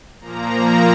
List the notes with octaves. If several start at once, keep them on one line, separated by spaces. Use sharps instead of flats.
A#2 F3 A#3 A#5